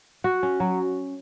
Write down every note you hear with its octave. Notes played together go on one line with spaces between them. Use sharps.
F#4
C#4
F#3